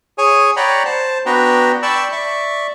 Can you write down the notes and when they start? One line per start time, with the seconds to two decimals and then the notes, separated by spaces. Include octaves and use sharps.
0.18 G#4 C#5 G#5
0.56 C#5 D5 F#5 G5 A#5 B5
0.86 C5 A5
1.26 B3 D4 F#4 B4 G5 A#5
1.83 D5 G5 A5 B5 C#6 E6
2.12 D5 E5 C#6